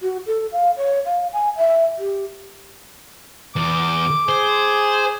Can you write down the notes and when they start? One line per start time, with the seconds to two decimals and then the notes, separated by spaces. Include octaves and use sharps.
0.01 F#4
0.26 A4
0.52 F5
0.77 C#5
1.05 F5
1.33 G#5
1.57 E5
1.98 G4
3.56 E2 D6
4.29 G#4 C5